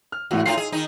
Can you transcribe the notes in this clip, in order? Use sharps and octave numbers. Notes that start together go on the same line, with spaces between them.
F6
E2 A2 F#4
A2 D#4 F4 C7 F7
G#4
D#3 D#4